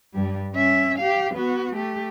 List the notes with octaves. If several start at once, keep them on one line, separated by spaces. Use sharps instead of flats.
G2 G3
C#4 E5
G4 F5
B3 F#4
A3 G4